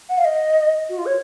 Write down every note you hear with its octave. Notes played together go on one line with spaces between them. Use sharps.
F#5
F5
D#5
F#4
F4
C#5